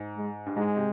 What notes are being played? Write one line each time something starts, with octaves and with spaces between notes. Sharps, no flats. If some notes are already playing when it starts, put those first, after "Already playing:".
Already playing: G#2
G#3
G2
G#2 G#3
C3